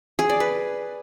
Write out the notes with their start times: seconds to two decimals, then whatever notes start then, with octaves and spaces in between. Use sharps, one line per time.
0.19 G#4
0.30 D5
0.40 B4